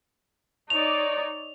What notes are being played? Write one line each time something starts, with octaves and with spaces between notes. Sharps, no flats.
D#4 C#5 D5 F7